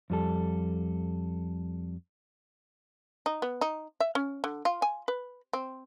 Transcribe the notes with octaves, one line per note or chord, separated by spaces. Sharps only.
F2 G3 A4
D#4
B3
D#4
E5
C#4
D3
F4
G#5
B4
C4